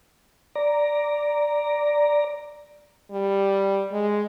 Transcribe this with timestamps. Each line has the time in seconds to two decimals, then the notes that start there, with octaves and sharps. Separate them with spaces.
0.55 D5 A#5
3.11 G3
3.92 G#3